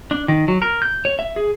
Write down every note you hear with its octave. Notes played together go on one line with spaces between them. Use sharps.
D4
D#3
F#3
A#4
G6
C#5
E5
G#4